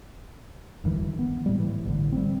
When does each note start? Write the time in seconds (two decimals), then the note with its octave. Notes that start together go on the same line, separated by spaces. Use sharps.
0.84 E1 G2 D#3 E3
1.19 B3
1.46 A2 G3
1.60 E3
1.85 A1 A2 D3
2.12 G3 C4